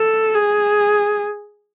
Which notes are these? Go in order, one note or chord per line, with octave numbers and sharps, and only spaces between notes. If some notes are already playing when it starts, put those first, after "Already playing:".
Already playing: A4
G#4